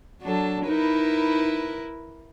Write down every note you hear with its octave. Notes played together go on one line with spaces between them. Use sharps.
F#3 D4 A4
D#4 E4 A#4 B4